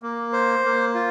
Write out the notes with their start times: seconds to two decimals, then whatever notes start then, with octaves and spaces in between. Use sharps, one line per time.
0.03 A#3
0.33 C5
0.64 A#3
0.95 F4